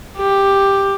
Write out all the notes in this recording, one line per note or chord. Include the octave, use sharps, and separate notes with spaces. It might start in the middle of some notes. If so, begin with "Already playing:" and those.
G4